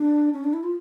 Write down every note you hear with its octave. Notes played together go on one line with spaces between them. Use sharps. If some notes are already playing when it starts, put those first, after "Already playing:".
Already playing: D4
C#4
D4
E4
F4